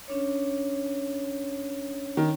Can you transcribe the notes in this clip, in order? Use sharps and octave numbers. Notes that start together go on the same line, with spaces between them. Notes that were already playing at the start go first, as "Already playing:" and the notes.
C#4 D4 C#5
D#3